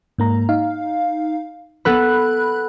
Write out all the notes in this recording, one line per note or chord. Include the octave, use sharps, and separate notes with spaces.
G#2 A#3 A#5
D#4 F5
B3 A4 B4 B5 F#6